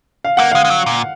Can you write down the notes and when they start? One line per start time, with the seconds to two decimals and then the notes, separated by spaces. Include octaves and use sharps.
0.25 F5
0.37 A#3 F#5
0.51 G#3 F5
0.65 G#3
0.70 F#3
0.86 A#2